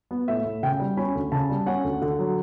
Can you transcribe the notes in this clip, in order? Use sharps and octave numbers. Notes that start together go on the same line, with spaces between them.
B3
A2 E5
A2
C#3 G5
G3
C#4 B5
D2
C#3 A5
G3
C#4 F#5
D2
D3 F#5
F#3